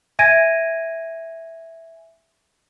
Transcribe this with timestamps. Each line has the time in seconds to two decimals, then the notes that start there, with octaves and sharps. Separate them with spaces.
0.19 E5 G#5 G#6 A#6 D7 D#7